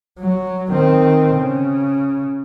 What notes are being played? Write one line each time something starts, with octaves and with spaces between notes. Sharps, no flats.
F#3
D#3 C4
C#3